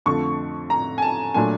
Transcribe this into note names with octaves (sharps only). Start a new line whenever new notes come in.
F2 D3 F3 A3 C#6
A#5
G#5
A5
A#2 F#3 A3 D4 G#5